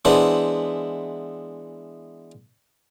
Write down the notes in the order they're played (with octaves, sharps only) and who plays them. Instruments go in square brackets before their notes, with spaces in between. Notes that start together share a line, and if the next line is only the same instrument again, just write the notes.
[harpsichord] E3 G#3 B3 D4 C5